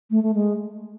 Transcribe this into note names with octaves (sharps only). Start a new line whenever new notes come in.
A3
A3
G#3